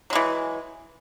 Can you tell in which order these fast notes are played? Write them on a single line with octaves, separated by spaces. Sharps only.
F#3 G#3 E3